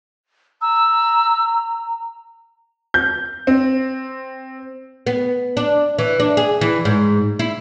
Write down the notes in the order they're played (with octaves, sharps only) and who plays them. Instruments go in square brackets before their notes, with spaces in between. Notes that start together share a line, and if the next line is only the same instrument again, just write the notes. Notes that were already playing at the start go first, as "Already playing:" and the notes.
[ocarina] A#5 [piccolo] E6
[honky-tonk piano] G6
C4
[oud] B3
D4
E3
D4
G#4
E3
G#2
E4